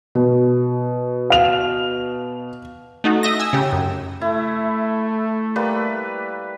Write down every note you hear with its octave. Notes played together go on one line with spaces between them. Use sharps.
B2
F5 F7
A3 D#4 F#4
D#5 E5 A#6
G#5 E6
C#3 G4
F#2
A3 E4
G3 A#3 B4